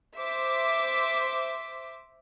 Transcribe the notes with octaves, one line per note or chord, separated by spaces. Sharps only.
C5 E5 D6